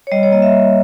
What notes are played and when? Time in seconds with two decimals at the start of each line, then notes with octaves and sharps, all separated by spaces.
0.07 C#5
0.12 G3 D#5
0.23 C#5
0.32 A#3 D#5
0.42 E5
0.52 G3